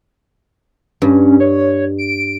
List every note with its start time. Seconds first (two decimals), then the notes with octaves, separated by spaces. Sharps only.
1.02 G2 C#4
1.40 C#5
1.98 D7